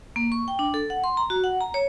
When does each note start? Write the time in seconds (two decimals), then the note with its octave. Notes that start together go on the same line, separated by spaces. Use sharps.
0.16 A#3
0.32 C#6
0.48 G5
0.59 D4
0.74 A4
0.90 F#5
1.04 C6
1.17 A#5
1.30 F#4
1.44 F#5
1.61 A#5
1.74 C#5